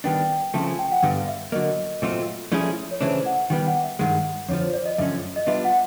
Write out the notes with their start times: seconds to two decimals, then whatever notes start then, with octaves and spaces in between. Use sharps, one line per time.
0.04 D#3 G3 B3 D4 G5
0.54 C#3 F3 A3 C4 A5
0.66 G#5
0.79 G5
0.91 F#5
1.03 G2 D3 G3 B3 F5
1.28 E5
1.52 D3 F#3 A#3 D#5
2.02 A#2 F#3 A3 C4 F4
2.52 F3 A3 C#4 E4 G#4 D5
2.91 C#5
3.01 C#3 E3 A3 D4 C5
3.26 F#5
3.50 D#3 G3 B3 G5
3.67 F#5
3.83 E5
3.99 G2 D#3 G#3 F#5
4.49 F2 D3 F3 C#5
4.61 C5
4.73 D5
4.86 D#5
4.98 F#2 D3 F3 A3 C#4 E5
5.36 D#5
5.47 G3 B3 D4 F4 E5
5.64 F#5